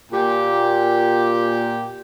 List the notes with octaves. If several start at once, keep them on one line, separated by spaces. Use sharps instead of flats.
A#2 G4